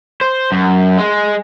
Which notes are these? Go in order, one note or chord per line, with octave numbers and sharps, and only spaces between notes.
C5
F#2
G#3